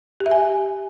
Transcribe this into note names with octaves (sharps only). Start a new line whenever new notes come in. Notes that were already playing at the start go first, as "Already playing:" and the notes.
G4
E5
G#5